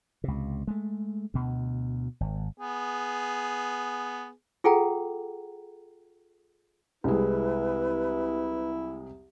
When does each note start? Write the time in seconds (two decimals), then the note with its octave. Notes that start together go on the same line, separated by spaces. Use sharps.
0.24 C#2 C3
0.67 G#3 A3
1.34 D2 B2
2.21 G#1
2.58 B3 G#4
4.64 F4 G#4 A4 F#5 G5 A#5
7.04 C2 G#3 E4 B4